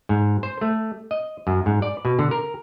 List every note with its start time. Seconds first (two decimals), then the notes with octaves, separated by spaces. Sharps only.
0.09 G#2
0.43 C5
0.61 A3
1.11 D#5
1.47 F#2
1.66 G#2
1.82 D5
2.05 B2
2.19 D3
2.31 A#4